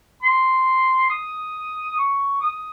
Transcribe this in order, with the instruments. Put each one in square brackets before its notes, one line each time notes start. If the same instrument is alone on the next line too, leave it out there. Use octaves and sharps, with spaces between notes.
[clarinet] C6
D#6
C#6
D#6